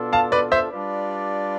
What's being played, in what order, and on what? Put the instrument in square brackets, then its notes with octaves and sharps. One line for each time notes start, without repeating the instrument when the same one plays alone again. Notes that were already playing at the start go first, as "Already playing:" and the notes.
Already playing: [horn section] B2 B3 D4 F4 A4
[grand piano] F5 A5
B4 D5
C5 E5
[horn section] G3 D4 F4 B4 D5